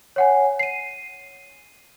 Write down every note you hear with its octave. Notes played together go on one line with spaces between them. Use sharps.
C#5 F#5 G#5
C7 D#7